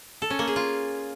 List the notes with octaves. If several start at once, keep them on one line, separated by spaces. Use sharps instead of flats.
A4
C#4
A#3
G#4
F4